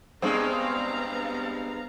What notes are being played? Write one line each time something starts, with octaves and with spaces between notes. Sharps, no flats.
G2 G#3 B3 C4 F5 A#5